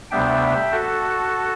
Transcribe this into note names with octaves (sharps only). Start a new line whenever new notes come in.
D2 C3 G3 B3 D4 E5 G5
F#4 A4